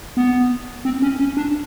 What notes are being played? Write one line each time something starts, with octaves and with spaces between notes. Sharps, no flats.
B3
C4
C#4
C#4
D4